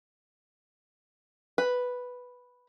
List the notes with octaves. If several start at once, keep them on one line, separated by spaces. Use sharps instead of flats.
B4